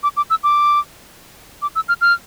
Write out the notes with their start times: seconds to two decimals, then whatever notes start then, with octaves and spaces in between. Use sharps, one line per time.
0.03 D6
0.17 D6
0.30 E6
0.43 D6
1.62 D6
1.75 E6
1.88 F6
2.01 F6